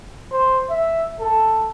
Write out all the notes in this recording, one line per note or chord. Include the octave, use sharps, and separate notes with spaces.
C5
E5
A4